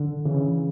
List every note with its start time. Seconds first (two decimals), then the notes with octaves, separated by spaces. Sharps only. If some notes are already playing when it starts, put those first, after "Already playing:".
Already playing: D3
0.25 C#3 E3